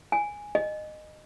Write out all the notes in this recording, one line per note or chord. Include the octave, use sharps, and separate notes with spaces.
G#5
D#5